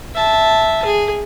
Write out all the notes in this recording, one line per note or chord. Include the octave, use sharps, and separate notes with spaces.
E5 A5
G#4